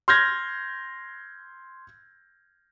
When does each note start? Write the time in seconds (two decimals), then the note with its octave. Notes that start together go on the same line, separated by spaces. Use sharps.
0.08 C6 F6 G6 G#6 A#6